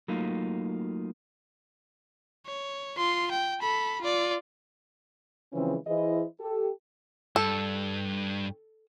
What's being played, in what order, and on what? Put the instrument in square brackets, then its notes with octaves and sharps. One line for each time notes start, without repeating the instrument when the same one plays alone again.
[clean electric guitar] F#3 A3 A#3 D#4 F4
[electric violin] C#5
F4 C6
G5
A4 B5
F4 D5
[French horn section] C#3 E3 F3 G#3 C4 C#4
E3 E4 G#4 C5 D#5
G4 A4
[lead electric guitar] G2 [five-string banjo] A4